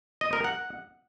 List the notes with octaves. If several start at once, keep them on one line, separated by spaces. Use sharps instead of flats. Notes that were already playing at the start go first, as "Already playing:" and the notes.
D#5
A#4
F#5